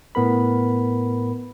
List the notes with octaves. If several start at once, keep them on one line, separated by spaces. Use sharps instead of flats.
A2 B3 A#4 B5